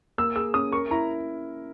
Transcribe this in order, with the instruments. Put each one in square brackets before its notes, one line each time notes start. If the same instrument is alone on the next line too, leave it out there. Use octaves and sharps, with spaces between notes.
[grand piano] A#3 [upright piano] E6
[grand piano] G#4 [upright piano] E6
[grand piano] C#4 [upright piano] D#6
[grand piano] A#4 [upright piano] C#6
[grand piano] E4 [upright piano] A#5